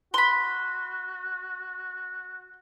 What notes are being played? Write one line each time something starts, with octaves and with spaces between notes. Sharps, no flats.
F#4 B5 C6